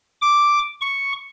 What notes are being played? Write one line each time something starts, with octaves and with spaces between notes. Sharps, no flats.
D6
C#6